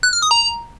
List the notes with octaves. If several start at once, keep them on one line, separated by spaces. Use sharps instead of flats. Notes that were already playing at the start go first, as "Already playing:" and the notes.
F#6
F6
D#6
A#5